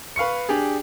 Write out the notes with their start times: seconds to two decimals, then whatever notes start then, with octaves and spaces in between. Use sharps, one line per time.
0.16 B4 F5 C#6 C#7
0.49 D4 G4 G#4